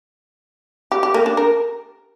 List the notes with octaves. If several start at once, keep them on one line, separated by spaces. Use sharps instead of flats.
G4
G4
A#3
D4
A#4